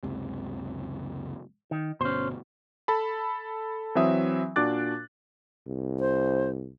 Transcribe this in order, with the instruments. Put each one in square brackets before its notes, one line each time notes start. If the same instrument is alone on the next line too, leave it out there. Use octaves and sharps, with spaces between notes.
[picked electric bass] F#1 C#2 C3
[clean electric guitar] D#3
[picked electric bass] G1 B2 [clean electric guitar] C#4 C5
[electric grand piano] A4 A5 B5
E3 F#3 C4 E5 D#6
A#2 D4 F#4 D6 F#6 A6
[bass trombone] C2
[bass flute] C5